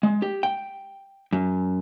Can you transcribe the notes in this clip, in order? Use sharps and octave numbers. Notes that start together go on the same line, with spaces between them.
G#3
G4
G5
F#2